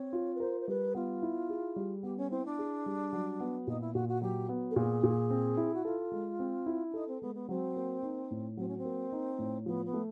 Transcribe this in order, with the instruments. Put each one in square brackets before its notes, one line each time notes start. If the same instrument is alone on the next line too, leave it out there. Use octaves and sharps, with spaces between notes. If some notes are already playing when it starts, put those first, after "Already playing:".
Already playing: [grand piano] C4 [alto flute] C#5
[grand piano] F4
[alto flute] B4
[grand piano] A#4 [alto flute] C5
[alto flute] C5
[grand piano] G3 [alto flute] B4
[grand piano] B3 [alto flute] F4
[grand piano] E4
G#4
G3
[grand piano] B3 [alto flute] G4
[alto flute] C#4
[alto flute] C4 [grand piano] E4
[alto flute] D4
[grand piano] G#4
G3
F#3
B3
[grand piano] A#2 [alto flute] D#4
[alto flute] E4
[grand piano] A#2 [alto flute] F#4
[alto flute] F#4
[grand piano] F#3 [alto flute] G4
[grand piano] B3
[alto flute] A4
[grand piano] A#2 [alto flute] G#4
[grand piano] A#2
C4
E4
[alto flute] F#4
[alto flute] F4 [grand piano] A4
[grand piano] G#3
C4
E4
[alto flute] D4
[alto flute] D#4 [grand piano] A4
[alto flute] C4
[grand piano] G#3 [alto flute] B3
[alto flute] B3
[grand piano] F#3 [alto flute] C4
[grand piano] A#3
D#4
A2
[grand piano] F#3 [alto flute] C4
[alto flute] C#4
C4
[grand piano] A#3
D#4
A2
[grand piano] F3 [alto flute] B3
[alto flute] B3
[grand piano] A3